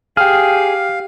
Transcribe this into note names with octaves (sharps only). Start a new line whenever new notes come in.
G4 G#4 F5 G5 F6